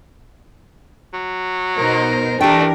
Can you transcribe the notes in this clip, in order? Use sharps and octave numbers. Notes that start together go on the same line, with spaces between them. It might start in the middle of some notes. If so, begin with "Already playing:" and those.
F#3
B2 D#4 A#4 C5
E3 A3 D4 G4 A#4 G5